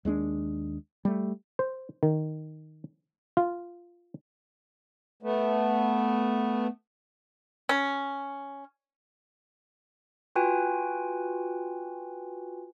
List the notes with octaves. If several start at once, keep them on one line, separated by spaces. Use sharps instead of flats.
D#2 G#3 C#4 D4
G3 A3
C5
D#3
F4
A3 B3
C#4
F4 F#4 B4 G5 G#5